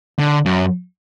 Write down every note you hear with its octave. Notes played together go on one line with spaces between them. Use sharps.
D3
F#2